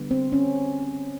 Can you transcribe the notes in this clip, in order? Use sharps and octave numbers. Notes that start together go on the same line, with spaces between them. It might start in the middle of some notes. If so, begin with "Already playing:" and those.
Already playing: D3 G3 B3
C4
C#4